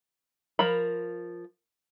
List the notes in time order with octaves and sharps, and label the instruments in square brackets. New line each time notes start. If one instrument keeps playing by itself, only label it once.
[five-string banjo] F3 A#4 B5